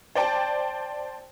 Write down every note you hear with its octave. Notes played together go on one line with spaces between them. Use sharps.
C5 D5 G5 A5